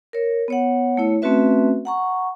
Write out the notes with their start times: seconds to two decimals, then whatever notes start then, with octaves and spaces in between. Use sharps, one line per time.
0.13 A#4 C#5
0.48 B3 C#5 F#5
0.97 A3 E4 C#5
1.22 A3 C4 C#4 F#4 B4 E5
1.85 F#5 A#5 C#6